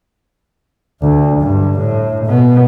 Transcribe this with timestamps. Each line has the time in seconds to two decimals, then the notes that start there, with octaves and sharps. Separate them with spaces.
1.02 D2
1.41 G2
1.80 A2
2.26 B2 B3